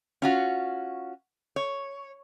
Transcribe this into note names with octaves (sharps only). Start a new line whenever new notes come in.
C#4 F4 F#4
C#5